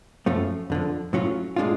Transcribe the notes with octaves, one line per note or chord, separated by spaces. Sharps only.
F#2 F3 A3 C#4 F4
F2 D3 F3
A2 F#3 C#4 F4
A2 G#3 D4 F4